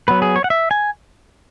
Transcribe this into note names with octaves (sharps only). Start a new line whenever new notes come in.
F#3 B3 B4
G#4
C#5
F#5
E5
G#5